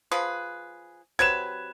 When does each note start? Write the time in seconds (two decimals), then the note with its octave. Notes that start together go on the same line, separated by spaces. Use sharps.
0.11 F3 G#4 B4
1.19 C3 F#3 B4 G#6 E7